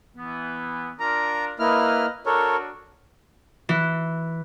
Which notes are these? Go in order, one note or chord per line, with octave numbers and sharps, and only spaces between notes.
E3 B3
D4 F4 A#4 A#5
A#3 E4 B4 D#5 F6
D4 F#4 A4 A#4 C#5
E3